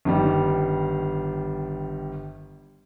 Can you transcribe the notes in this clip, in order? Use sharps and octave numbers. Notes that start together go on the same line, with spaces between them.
G1 D#3 G3